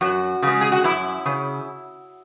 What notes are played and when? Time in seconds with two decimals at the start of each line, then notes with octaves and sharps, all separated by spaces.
0.01 F#2 F#4
0.42 C#3 G#3
0.61 G#4
0.72 F#4
0.84 F#2 E4
1.26 C#3